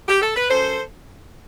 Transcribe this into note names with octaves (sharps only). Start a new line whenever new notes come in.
G4
A4
B4
F#2 A4 C5